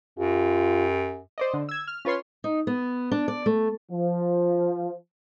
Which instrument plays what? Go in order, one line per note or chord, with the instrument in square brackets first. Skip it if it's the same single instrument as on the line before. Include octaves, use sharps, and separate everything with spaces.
[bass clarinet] F#2 [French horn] F4 [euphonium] G4
[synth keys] C5 D5 D#5
D3
E6 G#6
F6
C#4 F4 B4 C#5 C6
[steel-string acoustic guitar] D#4
B3
D4
D5
A3
[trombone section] F3